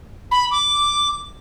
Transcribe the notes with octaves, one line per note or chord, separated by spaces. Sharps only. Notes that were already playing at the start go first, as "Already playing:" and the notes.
B5
D6